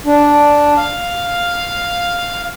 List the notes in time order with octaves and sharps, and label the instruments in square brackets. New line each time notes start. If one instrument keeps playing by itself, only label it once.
[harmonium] D4
F5